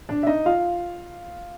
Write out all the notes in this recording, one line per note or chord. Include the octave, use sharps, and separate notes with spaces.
D4 D5
E5
D#4 D#5
F4 F5